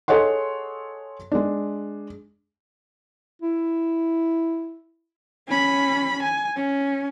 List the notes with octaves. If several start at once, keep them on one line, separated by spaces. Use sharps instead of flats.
G#4 A4 C#5 D#5 F#5 C6
G#3 D4
E4
C#4 B5
G#5
C#4